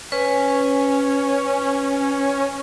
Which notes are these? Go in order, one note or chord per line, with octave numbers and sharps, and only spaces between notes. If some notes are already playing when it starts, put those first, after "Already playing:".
C#4 B4